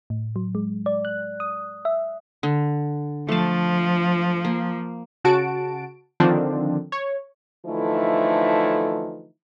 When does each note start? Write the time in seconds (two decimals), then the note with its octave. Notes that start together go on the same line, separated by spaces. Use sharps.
0.10 A2
0.36 F#3
0.55 G#3
0.86 D5
1.05 F#6
1.40 D#6
1.85 E5
2.43 D3
3.29 F3 A3 A5
4.45 A#3
5.24 C#3 F#4 A5 D7
6.20 D3 D#3 F3 C4 D4
6.92 C#5
7.65 D3 E3 F3 A3 D#4 E4